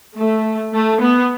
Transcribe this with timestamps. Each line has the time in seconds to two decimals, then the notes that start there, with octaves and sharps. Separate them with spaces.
0.16 A3
0.73 A3
1.01 B3